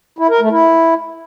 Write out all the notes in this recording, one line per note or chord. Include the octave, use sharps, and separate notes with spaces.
E4
A#4
A3
E4